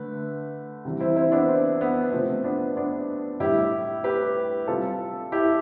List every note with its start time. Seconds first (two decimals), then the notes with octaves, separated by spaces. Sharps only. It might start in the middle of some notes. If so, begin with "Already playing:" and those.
Already playing: D3 A3 B4
0.85 C3 E3 G3
1.00 C4 E4
1.16 C4 E4
1.32 B3 D4
1.48 C4
1.81 B3
2.12 C3 F3 A3 C4
2.44 B3 D4
2.76 B3 D4
3.40 A2 G3 E4 G4
4.04 G4 B4
4.68 C3 G3 F4 A4
5.32 E4 G4